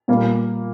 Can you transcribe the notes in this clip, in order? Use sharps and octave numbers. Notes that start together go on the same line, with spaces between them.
A#2 G3 A#3